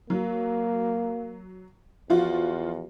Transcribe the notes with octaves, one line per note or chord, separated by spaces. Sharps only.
F#3 A#3
E2 F3 F4 F#4